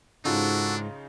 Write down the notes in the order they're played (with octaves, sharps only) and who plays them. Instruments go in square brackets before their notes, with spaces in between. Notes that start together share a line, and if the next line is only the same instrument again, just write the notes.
[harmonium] G#2 [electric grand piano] C#3 D#4 F4 [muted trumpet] D4 [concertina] F#4 A4